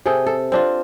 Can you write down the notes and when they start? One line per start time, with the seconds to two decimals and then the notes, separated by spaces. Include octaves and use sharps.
0.06 C3 G#4 A4 G5
0.26 A4
0.52 C4 D4 F4